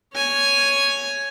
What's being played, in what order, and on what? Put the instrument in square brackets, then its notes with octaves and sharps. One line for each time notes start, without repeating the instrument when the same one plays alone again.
[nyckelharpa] C#5 G#5